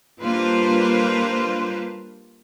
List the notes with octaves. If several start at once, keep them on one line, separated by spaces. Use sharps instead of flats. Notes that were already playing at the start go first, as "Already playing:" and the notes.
G3 A#3 D4 F4 B4 C5